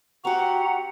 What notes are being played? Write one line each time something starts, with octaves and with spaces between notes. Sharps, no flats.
C4 F#4 G4 F#5 A#5